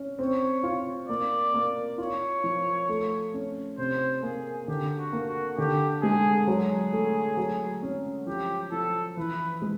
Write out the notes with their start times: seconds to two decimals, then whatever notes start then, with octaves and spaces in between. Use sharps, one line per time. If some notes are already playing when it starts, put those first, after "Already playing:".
Already playing: C#4
0.19 C4 C#5
0.63 F4
1.09 A#3 D5
1.54 A#3
1.98 F4 C#5
2.44 F3
2.89 A3
3.34 C#4
3.78 C3 C5
4.23 A#3 G#4
4.68 D3 G4
4.98 F#4
5.13 A#3
5.27 F#4
5.57 D3 G4
6.02 G#3 G#4
6.47 F#3 G#4
6.93 A3
7.37 F#3
7.82 C#4
8.26 F3 G4
8.72 F3 A4
9.17 E3 B4
9.62 G#3